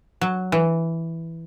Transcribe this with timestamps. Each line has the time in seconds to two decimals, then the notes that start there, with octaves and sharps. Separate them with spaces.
0.21 F#3
0.52 E3